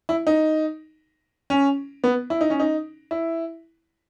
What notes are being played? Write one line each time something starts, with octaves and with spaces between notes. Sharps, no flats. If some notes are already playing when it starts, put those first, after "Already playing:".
E4
D#4
C#4
B3
E4
D#4
C#4
D#4
E4